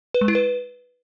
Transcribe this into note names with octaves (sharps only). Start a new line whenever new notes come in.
B4
G#3
E4
B4